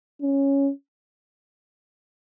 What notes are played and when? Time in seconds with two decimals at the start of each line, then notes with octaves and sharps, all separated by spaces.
0.22 C#4